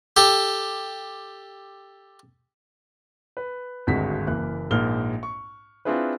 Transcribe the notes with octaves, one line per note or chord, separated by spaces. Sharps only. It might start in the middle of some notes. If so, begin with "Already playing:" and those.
G4 A4
B4
G#1 D2 G2 G#3 F#4 B6
F#1 E3 A#3 F#6
A#1 G#2 A#3 F6 G7
C#6
C4 D4 E4 F4 G#4 B4